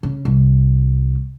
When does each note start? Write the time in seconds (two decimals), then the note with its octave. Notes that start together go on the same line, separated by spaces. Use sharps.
0.03 C#3
0.25 C2